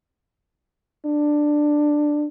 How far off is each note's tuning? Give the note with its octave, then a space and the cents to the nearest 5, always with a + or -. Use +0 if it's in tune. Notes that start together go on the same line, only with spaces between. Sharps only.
D4 +10